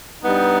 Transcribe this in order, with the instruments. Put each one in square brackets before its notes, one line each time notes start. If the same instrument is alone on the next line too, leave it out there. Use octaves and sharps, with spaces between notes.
[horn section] G2 G3 B3 D#4